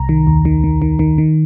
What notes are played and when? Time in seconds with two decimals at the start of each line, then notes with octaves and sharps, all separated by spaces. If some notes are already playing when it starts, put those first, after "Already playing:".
Already playing: C2 A#5
0.09 D#3
0.27 D#2
0.45 D#3
0.64 D#3
0.82 D#3
0.99 D#3
1.18 D#3